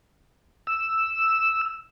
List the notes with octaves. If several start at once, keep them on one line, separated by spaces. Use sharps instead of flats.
E6